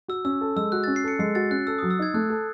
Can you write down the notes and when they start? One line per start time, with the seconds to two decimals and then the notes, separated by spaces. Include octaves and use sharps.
0.08 F#4 E6
0.25 C#4 E6
0.41 A4
0.56 G#3 E6
0.72 F#4 F#6
0.84 A6
0.88 C#4
0.96 C7
1.04 A4 C#7
1.19 G#3 C7
1.35 F#4 A6
1.51 C#4 F#6
1.67 A4 E6
1.79 D#6
1.83 F#3
1.90 E6
1.99 D#4 G#6
2.14 A3 F#6
2.30 A4